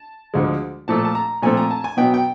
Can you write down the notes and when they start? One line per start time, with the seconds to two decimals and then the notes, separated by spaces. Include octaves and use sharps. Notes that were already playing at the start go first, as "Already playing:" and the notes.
Already playing: A5
0.34 D2 D3 F3 G#3
0.88 A#2 F3 A3 A5
1.05 A5
1.15 A#5
1.42 A#2 F3 A3 C4 G#5
1.57 A#5
1.71 A5
1.84 G#5
1.97 B2 F#3 B3 G5
2.14 G5